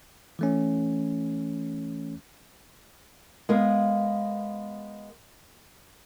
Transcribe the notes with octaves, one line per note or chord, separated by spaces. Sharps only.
E3 A3 C#4
G#3 B3 A#4 F5